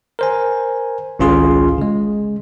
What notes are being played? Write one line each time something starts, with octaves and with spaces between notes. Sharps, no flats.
A#4 C5 G#5
G#1 C#2 C#4 F4 G#4 C6
C#3 G#3